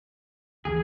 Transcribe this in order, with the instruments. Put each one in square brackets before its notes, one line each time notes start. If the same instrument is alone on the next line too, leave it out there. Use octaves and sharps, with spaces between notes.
[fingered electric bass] D2 E3 [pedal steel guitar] G#4